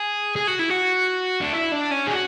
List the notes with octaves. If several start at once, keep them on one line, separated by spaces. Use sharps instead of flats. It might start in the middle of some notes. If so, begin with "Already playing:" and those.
Already playing: G#4
G#4
F#4
E4
F#4
D4
E4
D4
C#4
G#4
F#4